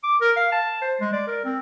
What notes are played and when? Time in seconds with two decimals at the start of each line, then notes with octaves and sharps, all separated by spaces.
0.04 D6
0.21 A#4
0.37 F5
0.52 A5
0.82 C5
1.01 G#3
1.13 D5
1.27 A#4
1.45 C4